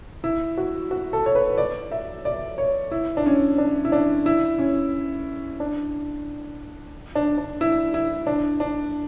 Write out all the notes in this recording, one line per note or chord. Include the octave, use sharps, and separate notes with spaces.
E4
F#4
F#4
A4
C#5
B4
D5
E5
D5
C#5
E4
D4
C#4
D4
E4
D4
E4
C#4
D4
D4
D4
E4
E4
D4
D4